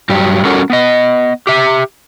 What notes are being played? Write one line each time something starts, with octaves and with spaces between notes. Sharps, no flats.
G2 F#3 G4
G3 C#4 F#4 A4 A#4
B3 D#5
G4 E5